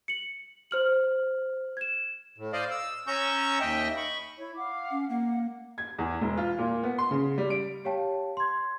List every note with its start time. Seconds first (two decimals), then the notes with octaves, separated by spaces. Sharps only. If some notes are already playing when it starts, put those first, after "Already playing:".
0.08 C#7 F#7
0.71 C5 F6 F#7
1.77 G#6 E7
2.38 A2
2.53 C5 D5 D#5 F5
2.71 E6
3.07 C#4 A#5 C#6 E6 G6
3.60 D#2 D#5 E5 G5
3.97 B5 C#6
4.38 E4 C#5
4.56 F5 F#5 D6
4.91 C#4
5.10 A#3 F#5
5.78 G#6
5.98 E2
6.21 E1
6.37 F4
6.58 A#2
6.83 B3
6.98 C6
7.11 C#3
7.38 G3
7.50 D7
7.85 G4 C#5 F5 G5 A5
8.37 C6 G#6